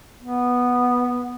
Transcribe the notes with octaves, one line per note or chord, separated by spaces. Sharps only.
B3